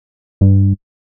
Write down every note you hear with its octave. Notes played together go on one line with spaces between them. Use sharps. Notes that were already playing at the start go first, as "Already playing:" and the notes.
G2